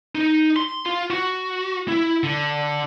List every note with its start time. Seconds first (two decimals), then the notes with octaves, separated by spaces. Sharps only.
0.15 D#4
0.56 C6
0.86 F4
1.10 F#4
1.88 E4
2.23 D3